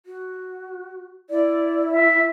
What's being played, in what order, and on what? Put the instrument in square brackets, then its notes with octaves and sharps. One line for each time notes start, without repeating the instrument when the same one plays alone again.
[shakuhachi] F#4
[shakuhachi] E4 [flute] D5
[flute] E5